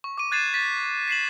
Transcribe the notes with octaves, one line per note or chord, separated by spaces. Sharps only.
C#6
D6 D#7
F#6 G#6 A6 C7 D#7 E7
A6 B6
B6 C7 E7 F#7